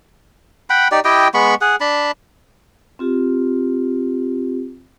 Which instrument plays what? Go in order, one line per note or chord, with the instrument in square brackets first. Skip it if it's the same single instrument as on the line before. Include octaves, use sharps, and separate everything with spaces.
[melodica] F#5 G5 B5
D#4 G4 D5
E4 G4 D#5 G5
G#3 B3 B5 C#6
G#4 F#5
D4 A5 B5
[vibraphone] C4 F4 G4